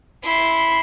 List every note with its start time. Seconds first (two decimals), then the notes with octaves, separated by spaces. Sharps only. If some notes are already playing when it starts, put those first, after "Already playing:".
0.24 E4 C6